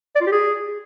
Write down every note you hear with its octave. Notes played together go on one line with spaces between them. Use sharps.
D5
F4
G4
G#4